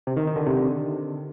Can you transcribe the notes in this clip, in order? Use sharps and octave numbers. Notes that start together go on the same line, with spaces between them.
C3
D#3
D#3
D3
C3
D3